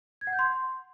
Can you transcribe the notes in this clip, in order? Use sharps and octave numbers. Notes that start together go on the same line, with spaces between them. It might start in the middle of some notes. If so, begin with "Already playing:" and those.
G#6
F#5
G6
C6